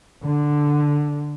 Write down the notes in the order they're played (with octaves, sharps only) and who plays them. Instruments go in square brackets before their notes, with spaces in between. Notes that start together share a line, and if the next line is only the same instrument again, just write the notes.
[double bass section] D3